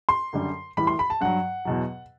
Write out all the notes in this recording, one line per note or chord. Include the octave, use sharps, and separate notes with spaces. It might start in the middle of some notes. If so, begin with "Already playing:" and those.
C6
F#2 D3 G3
A2 E3 G3 B5
C6
B5
A5
G2 F#3 F#5
E2 B2 F#3